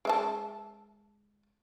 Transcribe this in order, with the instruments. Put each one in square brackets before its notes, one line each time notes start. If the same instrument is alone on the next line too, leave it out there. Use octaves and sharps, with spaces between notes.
[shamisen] G#3 E5 A5